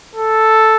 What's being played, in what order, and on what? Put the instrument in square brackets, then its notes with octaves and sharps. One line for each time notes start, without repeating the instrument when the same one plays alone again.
[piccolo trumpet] A4